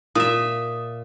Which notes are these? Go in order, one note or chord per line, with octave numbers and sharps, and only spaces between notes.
A#2 F4 E5 D#6